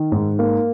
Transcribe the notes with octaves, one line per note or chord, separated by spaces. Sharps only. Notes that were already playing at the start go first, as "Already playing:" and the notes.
Already playing: D#3
G#2
A#3